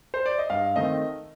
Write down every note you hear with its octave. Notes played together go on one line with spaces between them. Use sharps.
C5
D5
D#5
G2 F5
D#3 A3 C4 D#5